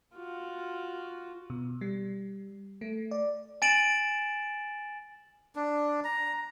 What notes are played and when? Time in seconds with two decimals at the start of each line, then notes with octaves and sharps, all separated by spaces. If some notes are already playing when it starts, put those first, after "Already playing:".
0.16 F4 F#4
1.50 B2
1.81 G3
2.81 A3
3.11 D5
3.62 G#5 A6 D7 E7 F#7
5.56 D4
6.04 A#5